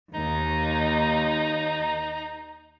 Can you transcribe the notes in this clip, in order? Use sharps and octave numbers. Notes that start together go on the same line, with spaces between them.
D#2 D#4